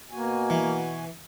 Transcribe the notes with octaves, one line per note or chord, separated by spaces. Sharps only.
B2 A#3 F#4 G#5
E3